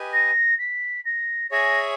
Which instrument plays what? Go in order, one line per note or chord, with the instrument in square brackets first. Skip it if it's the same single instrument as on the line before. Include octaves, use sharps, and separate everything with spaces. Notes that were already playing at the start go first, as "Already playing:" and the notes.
Already playing: [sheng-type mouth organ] G4 B4 D#5 G#5
[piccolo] A#6
B6
A#6
[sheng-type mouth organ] G#4 C#5 E5 G#5 [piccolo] A#6